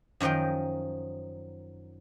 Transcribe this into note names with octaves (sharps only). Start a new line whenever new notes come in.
F#2 D#3 F3 D#5 G5